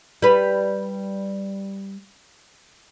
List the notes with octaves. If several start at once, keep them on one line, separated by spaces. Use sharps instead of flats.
G3 B4